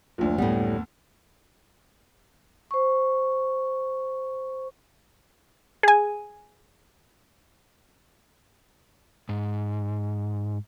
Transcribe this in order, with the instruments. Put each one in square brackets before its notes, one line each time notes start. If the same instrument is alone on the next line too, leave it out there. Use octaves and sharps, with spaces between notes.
[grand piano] F#1 D2 [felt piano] F3 D4
[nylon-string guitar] A2 G3 [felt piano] B3
[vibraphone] C5 C#6
[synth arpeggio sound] G#4 G#5
[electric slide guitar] G#2